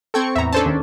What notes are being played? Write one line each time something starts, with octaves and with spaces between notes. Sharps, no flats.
C4 A4 G5 C#6 G#6
E2 A2 E5 A#5
C#4 D4 A4 C5 A5
D#2